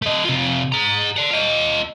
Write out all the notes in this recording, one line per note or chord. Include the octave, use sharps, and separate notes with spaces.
A3 D#5
C3 F4
G#4 A#5
D5 F#5
F4 D#5